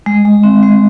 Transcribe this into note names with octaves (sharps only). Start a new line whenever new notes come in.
G#3
G#3
C4
G#3